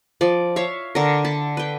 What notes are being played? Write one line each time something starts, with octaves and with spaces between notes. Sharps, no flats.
F3 D5
C#5 E5 F5
D3 A#4
A5 B5
B4 G5